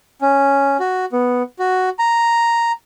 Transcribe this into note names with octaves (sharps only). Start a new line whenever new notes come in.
C#4
F#4
B3
F#4
A#5